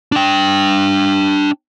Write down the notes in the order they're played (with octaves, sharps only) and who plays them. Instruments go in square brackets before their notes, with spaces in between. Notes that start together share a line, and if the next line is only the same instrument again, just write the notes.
[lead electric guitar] D4 G5